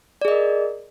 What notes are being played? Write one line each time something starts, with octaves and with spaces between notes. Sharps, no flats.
G#4 A#4 D5 D#5